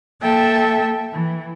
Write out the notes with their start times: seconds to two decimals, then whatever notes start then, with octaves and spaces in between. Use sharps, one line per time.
0.21 A#3 A4 E5 G5 A5
1.11 E3